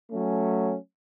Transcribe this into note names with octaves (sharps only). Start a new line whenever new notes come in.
F#3 A3 C#4